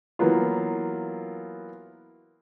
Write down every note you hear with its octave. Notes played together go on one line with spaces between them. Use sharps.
E3 F#3 A#3 B3 F4